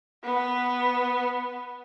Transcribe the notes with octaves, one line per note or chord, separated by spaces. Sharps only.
B3 B4